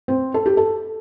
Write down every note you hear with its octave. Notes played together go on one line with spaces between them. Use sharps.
C4
A4
G4
A4